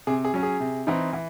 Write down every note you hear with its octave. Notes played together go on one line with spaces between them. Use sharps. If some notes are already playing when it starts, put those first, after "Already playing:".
C3 G#4
G#4
F#3 C#4
G#4
C3
E3 C4 D#4
E3